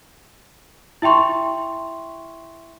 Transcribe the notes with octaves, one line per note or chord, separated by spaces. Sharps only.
E4 E5 G5 C6 C#6